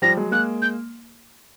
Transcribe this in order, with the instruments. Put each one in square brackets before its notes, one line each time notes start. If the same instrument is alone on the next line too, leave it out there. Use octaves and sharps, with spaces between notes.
[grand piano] F3 G3 [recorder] A#6
[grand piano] F#3 G#3
[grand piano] G#3 A#3 [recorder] F#6
[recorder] G6